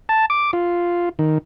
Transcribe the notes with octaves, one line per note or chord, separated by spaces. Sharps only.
A5
D6
F4
D#3